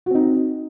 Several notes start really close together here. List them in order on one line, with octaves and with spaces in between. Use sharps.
F#4 C4 D#4